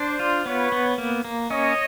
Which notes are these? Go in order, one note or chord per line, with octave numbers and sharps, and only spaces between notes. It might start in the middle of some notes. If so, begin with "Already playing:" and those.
Already playing: D4 C5 D5
F4
B3 B4 C#5
B3
A#3
A#3
C#4 C#5 D#5